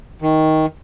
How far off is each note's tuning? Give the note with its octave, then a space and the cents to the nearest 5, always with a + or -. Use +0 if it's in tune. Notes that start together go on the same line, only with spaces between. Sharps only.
D#3 +15